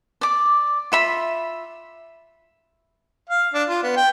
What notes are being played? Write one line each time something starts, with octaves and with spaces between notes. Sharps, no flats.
D5 D6
F4 E5 B5
F5
D4
F4
B3
G5